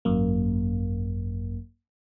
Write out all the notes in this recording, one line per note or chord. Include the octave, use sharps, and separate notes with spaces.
G#1 F#2 A#3